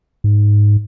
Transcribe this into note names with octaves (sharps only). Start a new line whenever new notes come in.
G#2